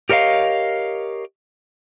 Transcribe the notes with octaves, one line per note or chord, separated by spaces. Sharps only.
G4 A#4 C#5 D#5 F5